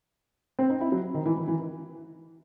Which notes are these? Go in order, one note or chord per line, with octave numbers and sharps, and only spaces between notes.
C4
D#4
E4
F#3
D#3
E3
E3
E3